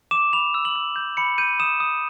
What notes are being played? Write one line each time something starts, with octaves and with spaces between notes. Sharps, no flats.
D6 E7
B5 F7
E6
F#7
E6
G6
B5 C#7
G6 D#7
D#6 E7
D#6